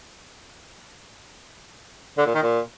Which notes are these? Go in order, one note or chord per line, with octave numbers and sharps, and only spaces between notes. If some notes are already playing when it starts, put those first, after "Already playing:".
D3
A#2
D#3
A#2